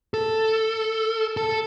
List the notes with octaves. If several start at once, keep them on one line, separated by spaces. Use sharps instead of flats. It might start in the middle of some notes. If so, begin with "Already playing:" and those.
A4
A4